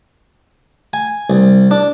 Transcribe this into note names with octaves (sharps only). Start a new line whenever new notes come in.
G#5
C2
D4